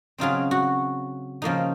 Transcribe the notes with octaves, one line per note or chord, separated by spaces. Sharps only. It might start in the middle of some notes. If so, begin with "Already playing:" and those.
C#3 F#3 C4 D#4 F4 G#4
F#4
C#3 F3 A#3 D#4